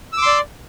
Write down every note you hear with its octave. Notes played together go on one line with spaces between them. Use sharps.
D5 C6 D6 E6